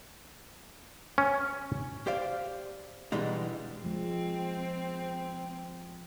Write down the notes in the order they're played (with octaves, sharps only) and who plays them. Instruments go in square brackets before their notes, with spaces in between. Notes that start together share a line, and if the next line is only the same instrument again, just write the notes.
[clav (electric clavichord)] C#4
[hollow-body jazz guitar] G4 C5 D5 F5
B2 D3 E3 G3 G#3 D#4
[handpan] F3 G#3 [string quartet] C4